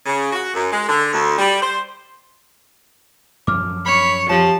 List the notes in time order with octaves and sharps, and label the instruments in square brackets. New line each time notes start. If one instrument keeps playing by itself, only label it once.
[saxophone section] C#3
F#4
F#2
G#3
D3
D2
G3
C5
[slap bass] F#2 F3 F#3 [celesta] D6 F6
[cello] C#5 [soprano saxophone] B5
[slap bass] F2 [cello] F3 [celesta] G4 C#5 E7 [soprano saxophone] A5